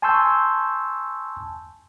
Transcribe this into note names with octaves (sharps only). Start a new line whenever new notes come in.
G#5 A5 C6 C#6 E6 G6